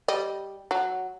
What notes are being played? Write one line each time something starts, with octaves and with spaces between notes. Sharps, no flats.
G3 D#5
F#3